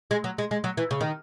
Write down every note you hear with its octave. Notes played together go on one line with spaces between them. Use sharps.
G#3
F#3
G#3
G#3
F#3
E3
C#3
D#3